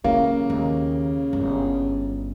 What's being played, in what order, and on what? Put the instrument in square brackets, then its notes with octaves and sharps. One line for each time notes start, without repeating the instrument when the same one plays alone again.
[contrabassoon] C#3 [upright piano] A#3 [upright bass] E4
[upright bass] D#2
G1